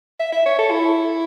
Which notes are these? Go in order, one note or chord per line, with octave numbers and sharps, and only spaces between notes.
E5
E5
C#5
A4
E4